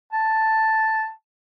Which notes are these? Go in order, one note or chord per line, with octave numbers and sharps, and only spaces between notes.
A5